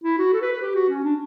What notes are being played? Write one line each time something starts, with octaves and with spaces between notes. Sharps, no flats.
E4
F#4
A4
B4
B4
G4
F#4
C#4
D4